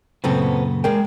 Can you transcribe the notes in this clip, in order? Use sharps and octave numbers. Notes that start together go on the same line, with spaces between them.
F#2 A#2 C#3 B3 C4 A4
G#3 G#4 A#4 G5